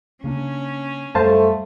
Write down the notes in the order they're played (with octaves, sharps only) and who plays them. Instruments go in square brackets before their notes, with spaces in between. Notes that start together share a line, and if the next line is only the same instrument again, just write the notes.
[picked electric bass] C#3 A#3 D4 [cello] C#4
[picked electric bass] F#2 G3 [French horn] A3 [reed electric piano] C5 F5 A5